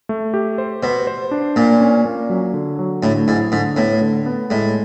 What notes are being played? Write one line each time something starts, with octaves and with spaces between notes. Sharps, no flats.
A3
G4
C5
B2 C5
C5
D4
A#2 A#3
C#4
A#3
F#3
D3
F#3
A2 D3
G#2 E4
G#2 D3
A2 B3
D3
B3
A2 G#3